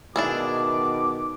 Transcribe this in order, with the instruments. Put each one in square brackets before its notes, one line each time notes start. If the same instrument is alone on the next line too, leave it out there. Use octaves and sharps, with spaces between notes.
[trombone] B2 [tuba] D#3 [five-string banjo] D4 E4 G#4 [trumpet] D6